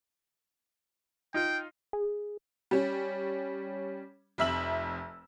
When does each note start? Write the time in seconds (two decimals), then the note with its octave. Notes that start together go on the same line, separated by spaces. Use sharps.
1.34 D#4 F4 G5
1.93 G#4
2.71 G3 C#4
4.38 F1 F2 E5 E6 F#7